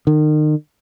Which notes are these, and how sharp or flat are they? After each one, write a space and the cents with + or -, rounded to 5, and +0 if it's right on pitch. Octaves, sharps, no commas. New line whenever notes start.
D#3 -35